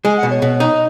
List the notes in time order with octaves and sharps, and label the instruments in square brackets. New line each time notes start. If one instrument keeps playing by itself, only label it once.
[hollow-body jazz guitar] G#3 [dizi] G#5
[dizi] F#5
[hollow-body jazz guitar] B2
[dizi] C#5
[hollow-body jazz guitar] B2
D#4
[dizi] D#5